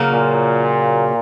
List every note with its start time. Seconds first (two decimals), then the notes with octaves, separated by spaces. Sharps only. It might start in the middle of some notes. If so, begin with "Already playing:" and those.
Already playing: C#3 F#3 A#3
0.11 A#2